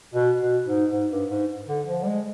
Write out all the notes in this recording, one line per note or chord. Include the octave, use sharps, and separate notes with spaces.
B2
B2
G#2
G#2
G2
G#2
D3
F3
G3
G#3